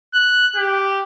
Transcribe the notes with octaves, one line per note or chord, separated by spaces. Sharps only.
F#6
G4